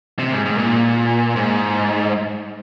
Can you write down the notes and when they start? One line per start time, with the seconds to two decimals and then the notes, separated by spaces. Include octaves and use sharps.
0.19 C3
0.32 G#2
0.45 G#2
0.58 A#2
1.36 G#2